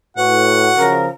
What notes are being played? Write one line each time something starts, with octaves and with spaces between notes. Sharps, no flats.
A2 F#4 B4 F#5
C#3 F3 A#4